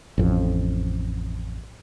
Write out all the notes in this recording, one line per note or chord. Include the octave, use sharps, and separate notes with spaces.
A1 F2